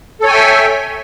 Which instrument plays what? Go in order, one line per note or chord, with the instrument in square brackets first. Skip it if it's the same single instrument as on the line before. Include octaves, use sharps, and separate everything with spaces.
[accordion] A4
C#5
G#5
G5
E5